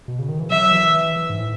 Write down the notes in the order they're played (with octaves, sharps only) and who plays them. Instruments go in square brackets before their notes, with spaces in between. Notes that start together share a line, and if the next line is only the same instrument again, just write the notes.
[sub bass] B2
C#3
D#3
E3
[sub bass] F#3 [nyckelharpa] E5
[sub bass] E3
E3
E3
G#2
A2